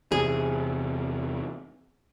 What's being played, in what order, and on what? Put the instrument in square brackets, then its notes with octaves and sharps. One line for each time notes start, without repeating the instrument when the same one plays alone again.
[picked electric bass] E2 C3 [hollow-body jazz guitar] G#4